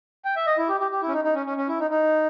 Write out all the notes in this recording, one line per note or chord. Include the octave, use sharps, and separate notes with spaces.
G5
E5
D#5
E4
G4
G4
G4
E4
C#4
D#4
D#4
C#4
C#4
C#4
E4
D#4
D#4